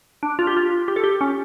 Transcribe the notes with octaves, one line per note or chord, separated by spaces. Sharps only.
D4
F4
G4
F4
G4
A4
G4
C#4